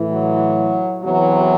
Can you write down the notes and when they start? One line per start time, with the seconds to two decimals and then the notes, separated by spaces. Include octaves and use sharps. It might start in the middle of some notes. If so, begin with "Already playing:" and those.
Already playing: A2 E3
0.12 F#3
1.03 E2 C3 E3 F#3